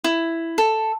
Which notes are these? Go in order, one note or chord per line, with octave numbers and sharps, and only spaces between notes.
E4
A4